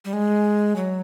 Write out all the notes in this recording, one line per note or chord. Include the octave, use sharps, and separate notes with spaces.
G3
G#3
F#3